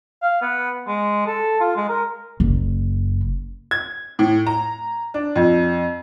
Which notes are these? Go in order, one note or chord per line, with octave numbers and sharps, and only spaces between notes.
F5
B3
G#3
A4
F4
G#3
A#4
F#1
G#6
A2
A#5
D4
F2